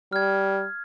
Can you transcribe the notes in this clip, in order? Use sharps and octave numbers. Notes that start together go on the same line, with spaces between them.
G3 F6 G#6